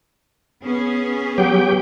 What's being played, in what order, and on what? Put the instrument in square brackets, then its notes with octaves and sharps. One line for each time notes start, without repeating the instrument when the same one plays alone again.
[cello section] B3 C#4 G#4
[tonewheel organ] F#3 G4 G5